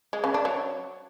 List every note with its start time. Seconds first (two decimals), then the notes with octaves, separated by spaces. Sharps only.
0.13 G#3
0.24 C#3
0.34 D4
0.45 F#3